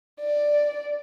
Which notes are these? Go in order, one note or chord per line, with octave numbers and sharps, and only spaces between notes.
D5